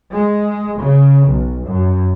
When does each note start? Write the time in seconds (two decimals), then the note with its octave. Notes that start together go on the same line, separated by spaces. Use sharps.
0.11 G#3
0.78 C#3
1.27 B1
1.62 F#2